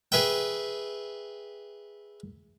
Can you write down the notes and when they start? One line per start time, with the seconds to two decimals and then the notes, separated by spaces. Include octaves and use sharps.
0.12 G#4 B4 E5 G5